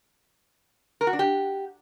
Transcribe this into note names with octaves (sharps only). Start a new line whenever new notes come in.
A#4
F#4
D4
G4